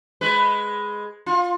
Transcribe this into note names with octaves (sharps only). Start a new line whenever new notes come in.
G#3 B4
F4